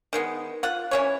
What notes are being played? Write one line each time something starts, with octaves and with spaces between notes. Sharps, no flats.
D#3 G#3 B3
F4 F#5
E3 C#4 C#5